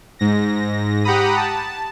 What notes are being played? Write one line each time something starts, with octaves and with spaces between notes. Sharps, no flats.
G#2 A#6
G4 F#5 A#5 B5 D#6
A5